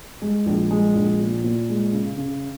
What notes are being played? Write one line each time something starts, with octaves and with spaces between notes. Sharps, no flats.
G#3
A#1
G#3
A#1
A#2
A#2
G#3
C#3
C#3